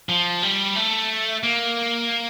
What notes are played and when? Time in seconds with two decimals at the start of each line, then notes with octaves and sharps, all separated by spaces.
0.09 F3
0.43 G3
0.76 A3
1.43 A#3